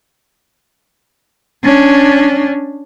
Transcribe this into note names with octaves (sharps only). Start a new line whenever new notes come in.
C#4 D4